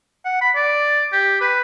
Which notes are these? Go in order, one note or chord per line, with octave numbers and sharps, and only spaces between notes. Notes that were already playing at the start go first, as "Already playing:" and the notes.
F#5
B5
D5
G4
B4